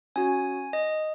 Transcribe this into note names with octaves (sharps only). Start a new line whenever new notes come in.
C#4 F#4 G#5
D#5